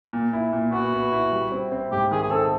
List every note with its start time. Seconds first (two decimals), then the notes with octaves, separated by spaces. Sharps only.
0.13 A#2
0.33 E4
0.53 A#2
0.72 B3 F#4
0.92 B3
1.12 E4
1.32 G3
1.52 C4
1.72 C4
1.92 G#2 G4
2.11 D#3 G#4
2.22 G#4
2.31 C4 A4